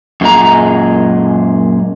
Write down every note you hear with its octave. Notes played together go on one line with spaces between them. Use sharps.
F#2 A#2 G#3 A#5